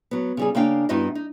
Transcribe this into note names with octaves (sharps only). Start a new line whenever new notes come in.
F#3 B3
C#3 G3 G#4
C#3 A#3 D4 F5 G5
G2 B3 D#4 E4 F#4 D#5
D#4